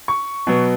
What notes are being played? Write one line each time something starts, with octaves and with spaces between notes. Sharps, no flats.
C#6
B2 F#3 B3